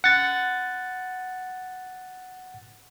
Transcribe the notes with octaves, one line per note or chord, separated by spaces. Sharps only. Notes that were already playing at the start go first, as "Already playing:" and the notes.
F#5 A6